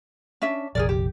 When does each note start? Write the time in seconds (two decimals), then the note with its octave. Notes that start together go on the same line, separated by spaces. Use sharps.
0.42 C#4 D4 E5
0.75 F1 A#1 G#4 A#4 D5
0.89 G4